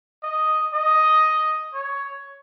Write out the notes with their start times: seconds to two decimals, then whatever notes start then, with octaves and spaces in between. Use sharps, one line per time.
0.23 D#5
0.74 D#5
1.74 C#5